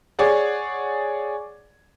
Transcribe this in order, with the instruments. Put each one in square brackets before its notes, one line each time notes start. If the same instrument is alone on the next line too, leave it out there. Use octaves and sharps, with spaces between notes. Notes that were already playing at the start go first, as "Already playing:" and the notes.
[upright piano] G#4 C#5 D5 F#5